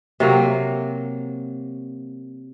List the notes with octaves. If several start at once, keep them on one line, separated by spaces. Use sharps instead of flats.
C3 F#3 A#3